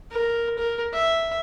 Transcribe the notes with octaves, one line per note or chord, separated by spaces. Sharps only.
A#4
A#4
E5